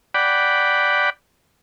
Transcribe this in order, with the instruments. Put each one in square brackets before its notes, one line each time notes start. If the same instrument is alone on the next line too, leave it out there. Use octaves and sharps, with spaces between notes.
[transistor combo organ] D5 F#5 G5 B5